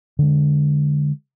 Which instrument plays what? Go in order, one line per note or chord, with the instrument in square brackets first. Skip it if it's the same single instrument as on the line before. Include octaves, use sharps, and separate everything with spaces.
[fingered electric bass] D3 G#3